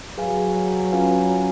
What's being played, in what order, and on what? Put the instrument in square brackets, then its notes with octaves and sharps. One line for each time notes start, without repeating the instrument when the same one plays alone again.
[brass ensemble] F#3 [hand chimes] G#4 B4 F5 G#5
[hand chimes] C#4 F4 B4 F5 G#5